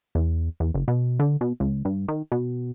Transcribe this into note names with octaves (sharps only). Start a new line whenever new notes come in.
E2
E2
F#1
B2
D3
B2
C#2
G2
D#3
B2